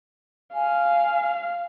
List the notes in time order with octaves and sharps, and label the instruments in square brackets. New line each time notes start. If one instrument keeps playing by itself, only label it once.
[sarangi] F5 [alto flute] G#5